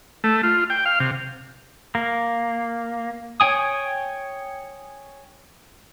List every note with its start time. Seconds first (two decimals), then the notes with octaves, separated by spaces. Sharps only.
0.24 A3
0.43 F4
0.70 G5
0.86 F5
1.00 C3
1.95 A#3
3.40 C#5 G5 G#5 D#6